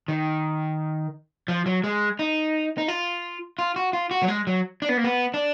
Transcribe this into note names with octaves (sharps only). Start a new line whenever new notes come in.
D#3
F3
F#3
G#3
D#4
D#4
F4
F4
F#4
F4
F#4
F#3
G#3
F#3
D4
B3
A#3
B3
D4